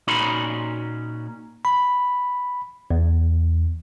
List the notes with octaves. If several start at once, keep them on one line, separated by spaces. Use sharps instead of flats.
A#2 C#4 D#4 F#4 B5 C6
B5
E2